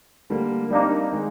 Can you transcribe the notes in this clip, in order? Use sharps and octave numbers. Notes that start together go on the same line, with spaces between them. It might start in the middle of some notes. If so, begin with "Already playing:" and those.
D3 G3 A#3
G3 A#3 C4 D4 D#4
D#3 G#3